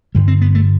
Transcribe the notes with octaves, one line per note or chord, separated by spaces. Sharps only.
G2 D3 G3
C4
B3
A3